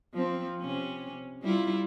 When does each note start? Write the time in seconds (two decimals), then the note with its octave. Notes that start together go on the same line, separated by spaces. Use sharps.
0.14 F3 C4
0.61 C3 C#4
1.42 G3 E4 F4